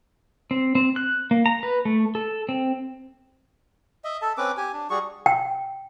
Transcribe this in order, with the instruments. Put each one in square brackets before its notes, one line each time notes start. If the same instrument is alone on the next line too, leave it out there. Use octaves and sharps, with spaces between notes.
[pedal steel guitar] C4
C4
F#6
A#3
A#5
B4
A3
A4
C4
[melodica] D#5 E5
A4 A5
C4 C#4 B4 D6
G4 G#5
D4
G3 F#4 G#4 C#6
[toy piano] G5